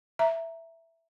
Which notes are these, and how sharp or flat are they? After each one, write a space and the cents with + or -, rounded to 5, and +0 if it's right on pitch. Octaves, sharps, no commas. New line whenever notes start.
E5 +0 A#5 +0